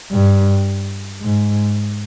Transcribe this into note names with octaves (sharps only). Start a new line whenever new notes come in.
G2
G#2